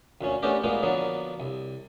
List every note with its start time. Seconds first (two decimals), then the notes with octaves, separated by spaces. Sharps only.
0.21 D2 A#2 C#4
0.43 A3 B3 C#4 D4 G4 A#4
0.64 A#2 G#3 A#3 B3 F4
0.82 D3 F3 F#3 A#3 B3
1.40 C2